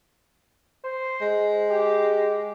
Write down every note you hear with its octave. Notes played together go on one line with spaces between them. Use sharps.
C5
G#3
G4